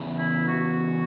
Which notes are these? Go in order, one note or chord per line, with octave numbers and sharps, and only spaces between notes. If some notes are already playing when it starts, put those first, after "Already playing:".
Already playing: E2 C#3 E3
E4
F#4